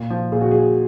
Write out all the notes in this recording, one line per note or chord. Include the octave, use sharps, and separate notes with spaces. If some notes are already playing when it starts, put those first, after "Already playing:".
Already playing: A#2
F3
A#2 G#4
F#4
F3 G#4